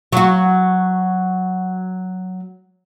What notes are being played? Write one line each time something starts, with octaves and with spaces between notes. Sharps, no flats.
F#3 F#4